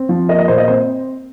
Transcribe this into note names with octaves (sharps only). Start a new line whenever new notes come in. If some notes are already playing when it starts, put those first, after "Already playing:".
Already playing: C4
F3
A#3 D#5
D#5
A#2 C5
D#5
C4 C5